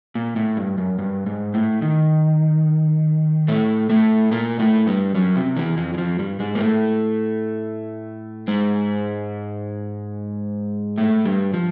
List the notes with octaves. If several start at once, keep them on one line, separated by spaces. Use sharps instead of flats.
A#2
A2
G2
F#2
G2
G#2
A2
D#3
A2 A3
A2 A3
A#2 A#3
A2 A3
G2 G3
F#2 F#3
C3
E2 E3
F2 F3
E3
F2 F3
G2 G3
G#2 G#3
A#3
A2 A3
G#2 G#3
A2 A3
G2 G3
F3